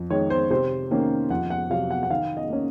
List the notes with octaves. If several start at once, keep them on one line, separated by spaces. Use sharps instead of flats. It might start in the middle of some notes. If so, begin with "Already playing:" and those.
Already playing: F2
D#3 G#3 C#5
C5
C3 C5
D#3 A#3 C#4
F2 F#5
F#5
C3 F#3 F5
F#5
F#5
D#3 F5
D#5
A#3 C#4